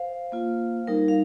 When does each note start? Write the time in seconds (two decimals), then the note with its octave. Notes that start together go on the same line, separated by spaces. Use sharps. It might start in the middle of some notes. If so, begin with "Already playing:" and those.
Already playing: C5 F5
0.32 A#3 F4
0.87 G3 D#4 A#4
1.08 F5